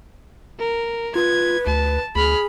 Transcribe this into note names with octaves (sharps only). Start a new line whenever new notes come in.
A#4
F4 B4 G#6
D2 A5
D2 G#4 B5 F6